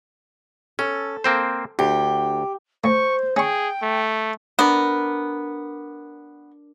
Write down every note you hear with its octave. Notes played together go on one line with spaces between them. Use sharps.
C#4 A4
A#3 C4 C5
D2 G4
A2 C5 C#6
C#4 G#4 G5 C#6
A3
B3 D4 A#4